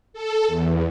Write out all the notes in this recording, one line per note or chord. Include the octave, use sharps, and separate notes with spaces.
A4
E2